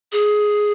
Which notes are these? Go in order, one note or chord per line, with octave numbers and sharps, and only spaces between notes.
G#4